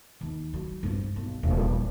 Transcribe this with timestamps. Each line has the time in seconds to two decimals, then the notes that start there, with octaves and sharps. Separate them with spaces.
0.21 D#2
0.54 F#3
0.83 G2 C4
1.16 B1
1.43 D#1 F3